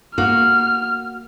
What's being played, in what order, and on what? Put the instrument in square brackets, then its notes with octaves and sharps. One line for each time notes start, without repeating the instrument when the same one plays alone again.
[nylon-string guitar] A#3 F#4 [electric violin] F6